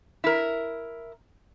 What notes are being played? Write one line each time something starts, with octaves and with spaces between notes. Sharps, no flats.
E4 A#4